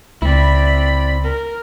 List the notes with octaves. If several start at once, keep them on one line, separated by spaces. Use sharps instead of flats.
C#2 C4 E4 D5 B5
A#4